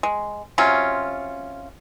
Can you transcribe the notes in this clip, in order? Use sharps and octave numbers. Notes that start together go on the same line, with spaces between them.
G#3
C3 F#3 C#4 F4